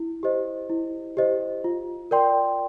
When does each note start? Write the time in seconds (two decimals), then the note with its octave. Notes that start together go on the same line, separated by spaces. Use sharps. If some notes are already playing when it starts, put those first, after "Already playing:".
Already playing: E4
0.23 G4 C5 D#5
0.69 E4
1.17 G4 C5 D#5
1.64 F4
2.11 A#4 D5 G5 C6